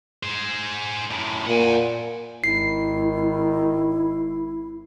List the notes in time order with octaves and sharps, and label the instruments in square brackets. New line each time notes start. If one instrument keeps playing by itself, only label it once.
[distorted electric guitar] G#4 C5
F#2 A2
[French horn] A#2 [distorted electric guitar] F#5 G#5
[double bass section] G#1 [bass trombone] D#3 [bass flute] E4 [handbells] C7